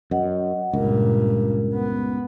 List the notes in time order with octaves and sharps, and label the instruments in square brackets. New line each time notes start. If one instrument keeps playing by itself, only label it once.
[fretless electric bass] F#2 [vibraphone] D#5 F#5
[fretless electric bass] C#2 [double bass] G2 A#2 [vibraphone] A#4
[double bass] B3